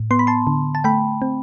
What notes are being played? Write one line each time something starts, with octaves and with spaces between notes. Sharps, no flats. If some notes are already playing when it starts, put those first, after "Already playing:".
Already playing: A2
B3 C6
B5
A5 C6
D3
A5
A3 G5 B5
C4